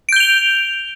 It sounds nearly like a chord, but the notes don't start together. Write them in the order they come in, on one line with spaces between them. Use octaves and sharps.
D7 G6 G7 F7